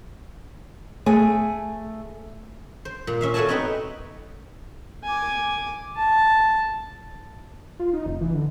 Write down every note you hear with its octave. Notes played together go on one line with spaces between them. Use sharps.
A3 G#4 G#5
C5
A#2
C#4 E5 F5
A3 F#4 C#5 D5 G#5 A5
B3 C4 D#4 B4
G#5 D6
A5
F4
D#4
F1
E3
D3